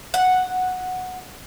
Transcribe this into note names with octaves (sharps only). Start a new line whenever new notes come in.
F#5